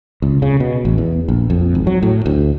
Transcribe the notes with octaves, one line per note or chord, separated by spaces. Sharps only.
C#2
C#3
B2
A1
E2
A#1
F2
G#1
F#3
A2
D2